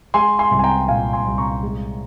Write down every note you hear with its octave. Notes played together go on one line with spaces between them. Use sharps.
G#3 G#5 C6
G#5 C6
C2
G#5
G5 A#5
A#2 F5 G#5
G#5 C6
C2
A#5 C#6
G#3